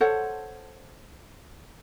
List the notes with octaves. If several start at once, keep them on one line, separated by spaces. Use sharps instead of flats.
A4 C5 C#5 F#5